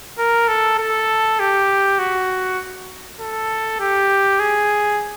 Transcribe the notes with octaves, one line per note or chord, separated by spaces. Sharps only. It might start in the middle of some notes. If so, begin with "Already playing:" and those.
A#4
A4
A4
G4
F#4
A4
G4
G#4